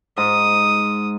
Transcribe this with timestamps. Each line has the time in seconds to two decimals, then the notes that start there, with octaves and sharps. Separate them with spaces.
0.18 G#2 D#6